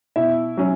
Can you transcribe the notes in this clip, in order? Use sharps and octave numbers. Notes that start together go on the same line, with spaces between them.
B2 E4 E5
F#3 C#4